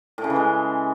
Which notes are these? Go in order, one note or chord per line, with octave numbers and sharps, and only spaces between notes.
A2
C#3
E3
G#3